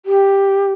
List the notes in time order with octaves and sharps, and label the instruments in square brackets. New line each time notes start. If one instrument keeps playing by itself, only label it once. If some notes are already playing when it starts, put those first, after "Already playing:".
[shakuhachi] G4